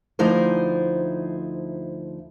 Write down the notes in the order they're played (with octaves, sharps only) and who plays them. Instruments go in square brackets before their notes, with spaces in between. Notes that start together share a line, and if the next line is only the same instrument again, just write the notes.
[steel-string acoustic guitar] D2 F3 D#4 E4 C5